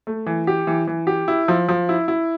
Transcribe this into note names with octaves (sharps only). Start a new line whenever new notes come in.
A3
E3
G4
E3
E3
G4
E4
F3
F3
E4
E4